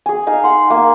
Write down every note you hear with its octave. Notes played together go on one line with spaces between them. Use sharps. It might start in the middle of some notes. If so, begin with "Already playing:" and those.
G#4 G#5
D#4 F5 G#5
F#5 C6
A#3 G#5